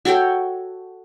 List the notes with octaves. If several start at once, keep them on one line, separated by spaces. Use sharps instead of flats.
F#4 A4 C#5 G5